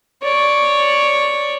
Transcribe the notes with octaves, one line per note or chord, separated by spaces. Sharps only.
C#5 D5